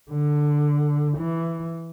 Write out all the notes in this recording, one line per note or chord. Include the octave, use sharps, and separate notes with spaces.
D3
E3